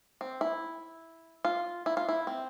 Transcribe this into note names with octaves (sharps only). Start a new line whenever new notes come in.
C4
E4
F4
E4
F4
E4
C4